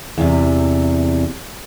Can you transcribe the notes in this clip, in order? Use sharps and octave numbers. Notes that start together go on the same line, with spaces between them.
E2 C3